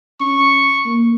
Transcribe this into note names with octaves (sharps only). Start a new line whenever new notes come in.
C#4 C#6
A#3